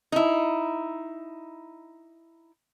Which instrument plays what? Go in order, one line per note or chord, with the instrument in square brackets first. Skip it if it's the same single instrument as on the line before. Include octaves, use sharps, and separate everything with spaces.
[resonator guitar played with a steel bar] D#4 E4